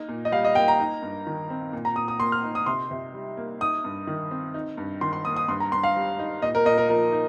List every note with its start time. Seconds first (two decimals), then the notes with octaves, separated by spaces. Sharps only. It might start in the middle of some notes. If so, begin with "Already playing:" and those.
Already playing: A#3 D#4
0.08 A#2
0.25 D#5
0.32 G3 F5
0.45 D#5
0.55 A#3 G5
0.68 A#5
0.79 D#4
1.02 G2
1.27 D#3
1.50 C4
1.73 A#2
1.85 A#5
1.96 A#2 D#6
2.08 D#6
2.20 A#3 C6
2.32 F6
2.44 D#4
2.55 D#6
2.66 C3 C6
2.91 C3
3.14 G3
3.37 A#3
3.61 D#4 D#6
3.84 G2
4.07 D#3
4.31 C4
4.54 D#4
4.77 G2
5.01 D#3 C6
5.13 C6
5.25 A#3 D#6
5.36 D#6
5.48 G2 C6
5.60 A#5
5.72 G2 C6
5.84 F5
5.96 G3
6.19 D#4
6.42 A#2 D#5
6.55 A#4
6.65 A#2 D#5
6.78 A#4
6.89 F3 A#4
7.12 D#4